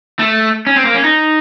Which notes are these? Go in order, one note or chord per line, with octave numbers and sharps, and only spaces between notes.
A3
C#4
C4
A#3
C#4
D#4